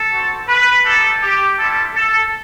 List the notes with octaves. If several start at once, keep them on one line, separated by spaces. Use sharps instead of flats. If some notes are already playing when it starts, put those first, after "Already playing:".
Already playing: A4
C4 F#4
B4
A3 D#4 G4 A4
G4
G3 C4 E4 G4 A4
A4